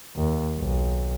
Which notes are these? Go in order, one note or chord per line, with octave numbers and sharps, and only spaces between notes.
D#2
B1